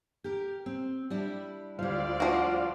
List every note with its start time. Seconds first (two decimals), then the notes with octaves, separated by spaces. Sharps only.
0.24 G4 A#4
0.66 C4
1.10 G3 D4 E4
1.79 D2 G3 E4 F4 C5 D5 F5
2.20 F3 F#4